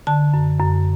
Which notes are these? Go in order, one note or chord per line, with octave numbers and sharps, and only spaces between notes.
D3 A5
F#2
F#2